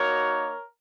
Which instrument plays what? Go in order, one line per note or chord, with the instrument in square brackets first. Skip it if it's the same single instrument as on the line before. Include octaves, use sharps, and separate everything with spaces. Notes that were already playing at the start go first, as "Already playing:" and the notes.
Already playing: [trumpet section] A#3 D#4 F#4 A#4 C#5